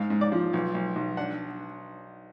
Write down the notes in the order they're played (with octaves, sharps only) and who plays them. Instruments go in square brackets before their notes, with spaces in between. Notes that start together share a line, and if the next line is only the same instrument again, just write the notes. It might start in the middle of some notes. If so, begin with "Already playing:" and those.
Already playing: [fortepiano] G#2 F5
G#2
D5
F3
B1
B1
B1
D4 F#5